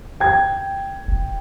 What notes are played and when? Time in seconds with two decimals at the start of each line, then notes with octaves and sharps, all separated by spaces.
0.20 G5 G#6
1.08 E1